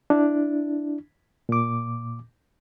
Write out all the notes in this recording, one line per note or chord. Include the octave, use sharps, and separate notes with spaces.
D4 E4
A#2 D6